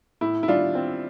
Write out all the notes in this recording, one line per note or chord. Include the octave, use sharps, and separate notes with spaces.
A2 E4
E4
G3 D4 F4
C4